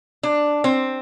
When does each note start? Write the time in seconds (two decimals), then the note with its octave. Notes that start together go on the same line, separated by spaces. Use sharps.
0.23 D4
0.64 C4